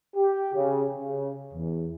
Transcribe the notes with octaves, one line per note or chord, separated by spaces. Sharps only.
G4
C#3
C#3
E2